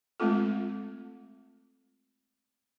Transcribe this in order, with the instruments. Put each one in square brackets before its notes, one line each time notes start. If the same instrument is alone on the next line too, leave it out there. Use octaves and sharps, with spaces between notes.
[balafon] G#3 A3 C4 F4 A4